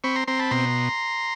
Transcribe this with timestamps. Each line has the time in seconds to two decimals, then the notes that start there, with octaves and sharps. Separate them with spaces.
0.04 C4 B5 C#6
0.16 A#5 C6
0.28 C4 A#5 C6
0.39 A5 B5
0.51 B2 A#5 C6